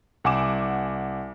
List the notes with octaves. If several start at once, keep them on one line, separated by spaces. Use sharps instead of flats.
C2 F#5 G#5 D6 E7